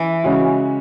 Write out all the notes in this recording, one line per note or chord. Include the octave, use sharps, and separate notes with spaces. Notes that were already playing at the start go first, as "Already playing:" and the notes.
Already playing: E3
C#3 G#3 C#4 F#4